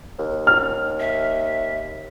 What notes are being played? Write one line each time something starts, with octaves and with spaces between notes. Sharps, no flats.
D#2
F6
E5